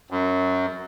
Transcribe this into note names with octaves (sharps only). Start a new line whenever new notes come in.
F#2